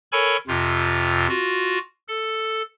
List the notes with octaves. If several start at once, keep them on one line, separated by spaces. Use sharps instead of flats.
A4 A#4 C#5 G#5 B5 C#6
F2 C3 F4
F4 F#4
A4